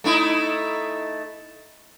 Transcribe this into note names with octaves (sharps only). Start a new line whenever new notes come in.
A3 D#4 E4